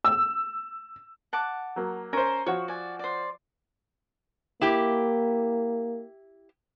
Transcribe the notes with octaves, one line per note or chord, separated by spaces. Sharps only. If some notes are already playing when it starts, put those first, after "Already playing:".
E6
F#5 A5 D6
F#3 A#3
C#4 A#4 C5
F3 F#4 C#5
D5 G#5
C5 D5
A#3 E4 G4